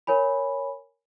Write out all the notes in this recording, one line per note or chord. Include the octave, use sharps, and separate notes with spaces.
A#4 C#5 G#5 B5